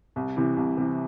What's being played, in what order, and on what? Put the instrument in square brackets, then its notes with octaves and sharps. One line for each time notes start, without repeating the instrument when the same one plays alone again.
[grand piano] C2
C3 E3
C2
C3 E3